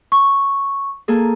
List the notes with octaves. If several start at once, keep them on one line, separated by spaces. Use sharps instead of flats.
C#6
A#3 G#4 A4